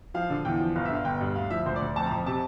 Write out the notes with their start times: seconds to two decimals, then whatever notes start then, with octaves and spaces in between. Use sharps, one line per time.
0.14 F3 F5
0.30 D3
0.45 E2 G5
0.60 F3
0.76 G1 F5
0.85 E5
0.90 D3 F5
1.05 G1 G5
1.21 G2
1.36 D2 F5
1.51 F3 E5
1.66 D2 C5
1.76 D5
1.81 D2
1.96 F2 A5
2.06 A#5
2.11 F2
2.26 C3 A5